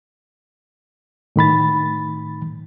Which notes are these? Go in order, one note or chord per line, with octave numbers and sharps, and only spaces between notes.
A2 D#3 B5 A6